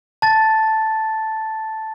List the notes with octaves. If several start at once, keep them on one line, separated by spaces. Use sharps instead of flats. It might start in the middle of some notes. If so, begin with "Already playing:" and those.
A5 A6